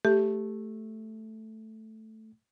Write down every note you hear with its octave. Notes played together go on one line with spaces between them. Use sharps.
A3 G4